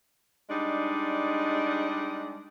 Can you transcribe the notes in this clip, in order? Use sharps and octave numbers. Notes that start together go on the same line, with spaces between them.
G3 G#3 D4 D#4